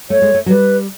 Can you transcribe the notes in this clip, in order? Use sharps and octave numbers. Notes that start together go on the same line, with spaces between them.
A3 C#5
G#3
A3
F#3
G3 B4